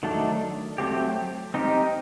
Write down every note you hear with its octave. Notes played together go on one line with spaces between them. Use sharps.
D#3 F#3 A3 D4
F#3 A3 C4 G4
C4 D#4 G4 A#4